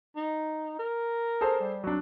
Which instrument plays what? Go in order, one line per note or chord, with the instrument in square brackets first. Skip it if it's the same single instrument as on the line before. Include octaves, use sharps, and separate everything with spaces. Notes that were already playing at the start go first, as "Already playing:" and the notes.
[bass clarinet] D#4
A#4
[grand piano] G#4 A4 C5
[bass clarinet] G3
[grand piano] F#3 D4